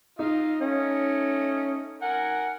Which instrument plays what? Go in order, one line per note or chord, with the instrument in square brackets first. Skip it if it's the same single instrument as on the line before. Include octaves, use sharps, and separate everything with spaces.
[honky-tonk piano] D#4 [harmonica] F4 D#5 F5
[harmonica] A3 D#5 [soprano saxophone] C#4
[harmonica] A#4 G#5 [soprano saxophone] F#5